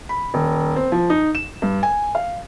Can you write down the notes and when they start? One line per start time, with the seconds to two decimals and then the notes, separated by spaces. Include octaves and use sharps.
0.09 B5
0.34 D#1
0.76 C4
0.92 F3
1.10 D#4
1.35 E7
1.62 G2
1.83 G#5
2.15 F5